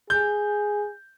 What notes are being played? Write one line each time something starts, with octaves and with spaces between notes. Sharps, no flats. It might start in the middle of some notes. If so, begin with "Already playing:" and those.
G#4 G6